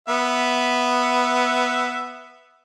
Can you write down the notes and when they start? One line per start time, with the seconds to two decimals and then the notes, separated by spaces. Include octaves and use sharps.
0.09 B3 E5